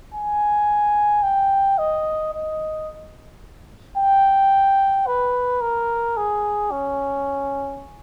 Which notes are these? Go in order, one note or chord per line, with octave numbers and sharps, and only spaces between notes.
G#5
G5
D#5
D#5
G5
B4
A#4
G#4
C#4